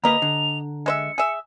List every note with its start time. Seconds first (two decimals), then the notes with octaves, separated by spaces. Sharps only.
0.04 D2 A#3 G4 B4 D#5 A#5 F7
0.22 D3
0.86 G#3 C5 E5 C#7
1.18 G#4 E5